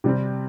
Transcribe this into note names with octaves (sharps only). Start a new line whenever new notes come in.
C3 G3 C4